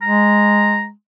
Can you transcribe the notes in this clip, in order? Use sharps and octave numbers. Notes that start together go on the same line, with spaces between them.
G#3 A#5